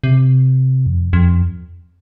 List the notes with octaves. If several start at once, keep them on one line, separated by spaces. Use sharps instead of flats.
C3
F2
F2